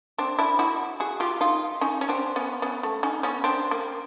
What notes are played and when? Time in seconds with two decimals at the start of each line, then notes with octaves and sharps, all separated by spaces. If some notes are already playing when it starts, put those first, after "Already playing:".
0.18 C4 D4
0.39 D4 E4
0.59 E4 F#4
1.00 F#4 G#4
1.20 F4 G4
1.41 D#4 F4
1.81 C#4 D#4
2.01 C#4
2.09 C4 D4
2.36 B3 C#4
2.62 B3 C#4
2.83 A3
3.03 C#4 D#4
3.23 B3 C#4
3.44 C4 D4
3.71 A#3